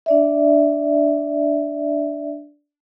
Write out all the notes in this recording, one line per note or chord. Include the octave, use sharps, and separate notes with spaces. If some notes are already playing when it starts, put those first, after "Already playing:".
D4 D5 E5